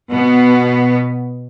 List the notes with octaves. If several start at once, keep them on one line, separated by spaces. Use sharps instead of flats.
B2 B3